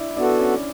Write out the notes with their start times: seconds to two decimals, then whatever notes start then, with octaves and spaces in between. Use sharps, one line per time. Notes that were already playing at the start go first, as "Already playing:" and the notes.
Already playing: D4 E4
0.10 E4
0.17 B3 D4 F#4 A4
0.40 C#4